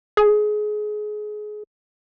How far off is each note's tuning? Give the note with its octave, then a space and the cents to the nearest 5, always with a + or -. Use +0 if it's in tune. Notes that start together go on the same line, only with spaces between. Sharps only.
G#4 +25